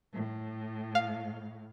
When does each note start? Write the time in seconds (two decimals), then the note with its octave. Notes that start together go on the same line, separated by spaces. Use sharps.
0.13 A2
0.95 F5